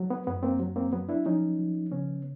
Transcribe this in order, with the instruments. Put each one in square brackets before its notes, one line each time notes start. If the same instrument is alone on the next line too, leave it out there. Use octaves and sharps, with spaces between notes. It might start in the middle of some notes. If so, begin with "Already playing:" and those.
Already playing: [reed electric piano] F#3
B3
F#2 B3
A#3 C4
F#3
A#3 C4
F#3 B3
D4 E4
F3 C#4 D#4
F3
C#3 B3 C#4